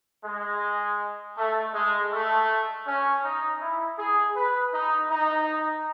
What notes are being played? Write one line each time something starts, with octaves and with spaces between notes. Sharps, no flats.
G#3
A3
G#3
A3
C#4
D#4
E4
G#4
B4
D#4
D#4